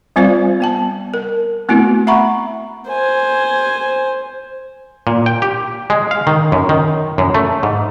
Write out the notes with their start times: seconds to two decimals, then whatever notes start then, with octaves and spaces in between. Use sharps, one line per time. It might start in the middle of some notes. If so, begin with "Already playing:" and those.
0.16 G3 C4 F4 C5 D5 F5
0.60 B3 G5 A5
1.14 A#4
1.69 A3 B3 C4 E4 F#4
2.07 E5 F#5 A#5 B5 C#6
2.89 C5 G#5
5.07 A#2
5.26 G5
5.42 G4
5.90 G#3
6.11 F5
6.27 D#3
6.52 F#2
6.69 D#3
7.18 F#2
7.35 A3
7.63 G#2